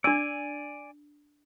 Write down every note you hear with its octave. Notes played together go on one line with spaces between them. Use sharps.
D4 D5 G#5 E6